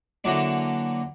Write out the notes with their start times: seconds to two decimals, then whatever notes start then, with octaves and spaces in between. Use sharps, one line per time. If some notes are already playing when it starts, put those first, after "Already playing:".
0.24 D3 E3 F#3 A#3 D4